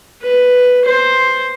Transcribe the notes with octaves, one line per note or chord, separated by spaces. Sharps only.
B4
C5